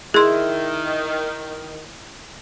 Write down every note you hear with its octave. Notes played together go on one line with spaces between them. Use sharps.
D#3 E4 G#4 C6